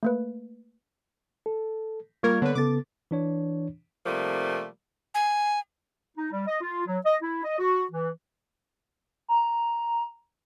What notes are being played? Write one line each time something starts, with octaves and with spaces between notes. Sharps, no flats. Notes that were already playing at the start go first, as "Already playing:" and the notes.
A3 A#3 B4
A4
G3 A#3 F4 A#4 C#6 G#6
D3 B3 B4 C#5
C#3 B3 A4 D6 A6
E3 D4 C#5
C3 F3 G3 A3 A#3
G#5
D#4
G3
D#5
F4
F#3
D#5
E4
D#5
F#4
E3
A#5